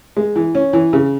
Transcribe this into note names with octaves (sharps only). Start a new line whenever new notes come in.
G#3
E3
C#4
E3
C#3